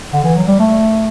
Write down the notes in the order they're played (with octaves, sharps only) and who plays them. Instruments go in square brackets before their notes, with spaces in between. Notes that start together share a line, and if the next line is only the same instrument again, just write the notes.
[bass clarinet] D3
E3
F#3
G3
A3